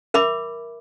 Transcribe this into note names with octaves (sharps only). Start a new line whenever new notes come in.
A#4 E5 B5 D6